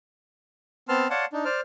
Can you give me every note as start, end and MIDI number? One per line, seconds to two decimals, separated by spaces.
0.89 1.08 59
0.89 1.08 60
0.89 1.08 81
0.89 1.08 84
0.89 1.08 89
1.10 1.25 73
1.10 1.25 74
1.10 1.25 77
1.10 1.25 78
1.10 1.25 81
1.10 1.25 84
1.33 1.45 62
1.33 1.45 63
1.45 1.61 72
1.45 1.61 74
1.45 1.61 89